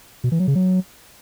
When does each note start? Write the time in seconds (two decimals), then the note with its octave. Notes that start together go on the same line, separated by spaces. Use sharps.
0.24 B2
0.32 E3
0.40 F#3
0.47 C#3
0.55 F#3